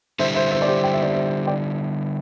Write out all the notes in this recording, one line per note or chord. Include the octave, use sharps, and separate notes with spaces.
D3 G3 E4 C5 E5
C5 E5
C5 E5
D5
G4 C5
G5
E5
D5
C5 E5
D5 G5